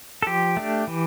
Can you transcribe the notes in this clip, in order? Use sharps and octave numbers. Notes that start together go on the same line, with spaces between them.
A4
F3 G4
A3 D4
E3